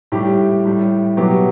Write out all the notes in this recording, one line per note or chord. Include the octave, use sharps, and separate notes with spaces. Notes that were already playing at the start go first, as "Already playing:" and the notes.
A2 G3 G4
A2 G3
B2 F#3 G4